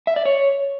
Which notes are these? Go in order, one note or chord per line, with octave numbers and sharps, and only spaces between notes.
E5
D5
C#5